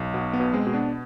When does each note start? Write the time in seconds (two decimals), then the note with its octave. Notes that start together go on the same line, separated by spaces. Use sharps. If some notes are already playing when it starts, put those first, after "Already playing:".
Already playing: B1
0.14 B2 B3
0.33 B3
0.40 B2
0.53 G#3 C4
0.67 B2
0.74 B3 D4